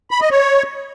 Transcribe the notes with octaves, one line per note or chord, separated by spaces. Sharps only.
B5
D#5
C#5